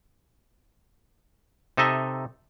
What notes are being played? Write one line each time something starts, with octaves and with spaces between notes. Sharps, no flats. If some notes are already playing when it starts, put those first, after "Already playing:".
C3 D#4 A4 D#5 E5